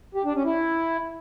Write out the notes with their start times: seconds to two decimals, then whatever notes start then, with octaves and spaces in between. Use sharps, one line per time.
0.15 G4
0.25 D4
0.35 C#4
0.45 E4